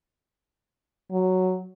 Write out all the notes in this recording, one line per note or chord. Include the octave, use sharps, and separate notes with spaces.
F#3